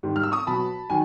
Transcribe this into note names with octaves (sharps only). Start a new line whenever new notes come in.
G#2 D#3 G3
F6
E6
C#6 D#6
B2 F#3 A5 B5
D#3 F#3 G#5